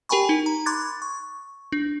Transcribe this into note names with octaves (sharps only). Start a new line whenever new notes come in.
G4 A#4 G5 G#5 B5 C#6
D#4
A#5
B5 C6 D6 F#6 G#6 A6
C#6
D4